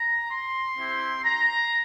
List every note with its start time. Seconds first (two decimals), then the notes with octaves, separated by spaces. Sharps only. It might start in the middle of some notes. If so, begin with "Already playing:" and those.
Already playing: A#5
0.29 C6
0.77 C4 E4 G4
1.24 A#5